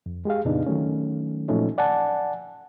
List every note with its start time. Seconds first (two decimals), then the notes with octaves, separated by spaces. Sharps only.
0.06 F2
0.25 G#3 G4 G#4 F5
0.45 F2 A#2 C#3 B3 D4 D#4
0.66 D#3 F#3 A3 C#4
1.48 A#2 F3 F#3 A3 C#4 D#4
1.78 D5 F#5 G#5 A5